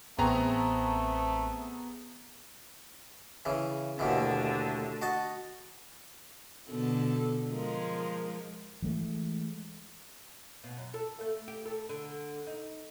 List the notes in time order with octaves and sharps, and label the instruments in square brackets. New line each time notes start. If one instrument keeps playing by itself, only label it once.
[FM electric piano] A1 C4 [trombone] A3 [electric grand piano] B3 G#4 A#5
[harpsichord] C#3 E3
[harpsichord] D#2 B2 E3 [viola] D3 A3
[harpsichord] F#4 D#5 A5
[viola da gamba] B2 D3 A4
F3 G#3 A#4
[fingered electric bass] E3 G#3 A3
[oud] B2
F#2
A4
A3
G4
A4
D3
D#4